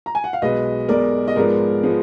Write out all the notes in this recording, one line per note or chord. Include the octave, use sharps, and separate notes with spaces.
A#5
G#5
F#5
F5
B1 B2 G#3 B4 D#5
B1 B2 G#3 A#4 D5
D#5
G#2 F3 G#3 B3 A#4 D5
F3 G#3 B3